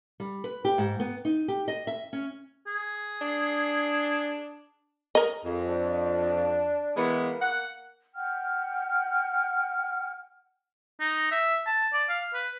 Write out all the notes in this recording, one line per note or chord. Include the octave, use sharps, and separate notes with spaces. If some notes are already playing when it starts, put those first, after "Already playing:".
G3
B4
G4
G#2
B3
D#4
G4
D#5
E5
C#4
G#4
D4
A#4 D#5
F2 G#3
D4
E3 G#3 A#3 B3
F#5
F#5 G5 F6
D#4
E5
A5
D5
F5
B4